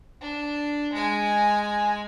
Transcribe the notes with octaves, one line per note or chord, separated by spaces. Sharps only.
D4
G#3 G#5